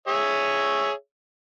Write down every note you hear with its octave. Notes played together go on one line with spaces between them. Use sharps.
G#4 C#5 E5